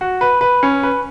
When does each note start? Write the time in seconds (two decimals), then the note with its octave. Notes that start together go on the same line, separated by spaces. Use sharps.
0.01 F#4
0.21 B4
0.41 B4
0.63 C#4
0.83 B4